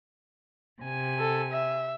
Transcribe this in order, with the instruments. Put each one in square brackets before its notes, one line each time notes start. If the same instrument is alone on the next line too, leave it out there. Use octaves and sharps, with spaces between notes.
[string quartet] C3 G#5
[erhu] A4
E5